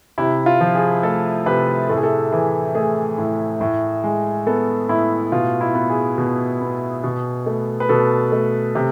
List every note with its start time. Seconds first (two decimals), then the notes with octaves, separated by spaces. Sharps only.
0.18 C3 E4
0.46 F4
0.61 F3
0.75 G#4
1.03 A3 A4
1.46 C3 B4
1.89 A2 A4
1.96 G#4
2.03 A4
2.32 E3 G#4
2.75 A3 G#4
3.18 A2
3.61 A2
4.04 G#3
4.47 B3 A4
4.89 A2 E4
5.32 B2 F4
5.61 E4
5.75 B3
5.89 G#4
6.18 B2
6.61 B3
7.04 B2
7.46 A3
7.80 B4
7.89 B2 A4
8.32 A3
8.75 C3